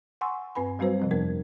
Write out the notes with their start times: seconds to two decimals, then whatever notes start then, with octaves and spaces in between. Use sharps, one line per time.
0.21 F#5 G#5 C6 C#6 E6
0.55 G2 C4 B4 G#5 B5
0.79 F#3 G3 C4 F#4 B4 C5
1.00 C3 F3 C4
1.11 F2 B3 A#4 G#6